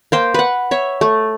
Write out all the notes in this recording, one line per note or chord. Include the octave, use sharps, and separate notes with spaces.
A#3 C5 G5
B4 F#5
C#5 E5
A3